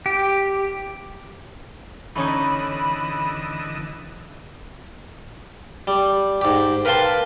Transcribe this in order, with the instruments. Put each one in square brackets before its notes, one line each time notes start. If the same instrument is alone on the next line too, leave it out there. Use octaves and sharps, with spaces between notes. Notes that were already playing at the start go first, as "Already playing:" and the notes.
[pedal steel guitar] G4
[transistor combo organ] D3 E3 D#5 [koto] A3 C#4 D#4 [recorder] B5
[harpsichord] G3
G#2 G4
A#4 B4 F5 G5 A5 C6